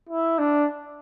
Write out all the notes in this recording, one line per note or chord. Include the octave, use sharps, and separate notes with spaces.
E4
D4